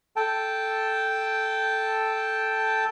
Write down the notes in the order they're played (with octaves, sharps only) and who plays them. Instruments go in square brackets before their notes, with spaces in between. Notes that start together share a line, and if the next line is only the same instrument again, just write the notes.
[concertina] A4 G5 A5